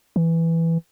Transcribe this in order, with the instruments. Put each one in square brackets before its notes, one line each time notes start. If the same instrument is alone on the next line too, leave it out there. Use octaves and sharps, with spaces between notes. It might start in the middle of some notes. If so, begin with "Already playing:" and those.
[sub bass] E3